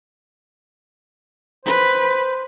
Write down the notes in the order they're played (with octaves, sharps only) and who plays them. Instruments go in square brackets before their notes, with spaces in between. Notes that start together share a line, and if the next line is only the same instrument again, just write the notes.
[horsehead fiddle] B4 [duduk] C5